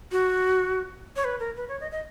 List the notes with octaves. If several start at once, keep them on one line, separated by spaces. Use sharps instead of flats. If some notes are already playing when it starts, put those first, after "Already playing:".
F#4
C#5
B4
A#4
B4
C#5
D#5
D#5